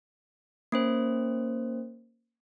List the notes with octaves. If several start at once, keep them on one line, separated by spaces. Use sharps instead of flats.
A#3 C#4 C5